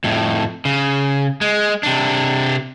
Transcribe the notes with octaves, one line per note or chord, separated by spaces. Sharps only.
F2 A2
C#3
G#3
C3 D4